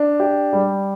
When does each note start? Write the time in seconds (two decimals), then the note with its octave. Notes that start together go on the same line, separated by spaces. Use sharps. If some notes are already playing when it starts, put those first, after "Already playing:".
Already playing: D4
0.20 G4
0.53 G3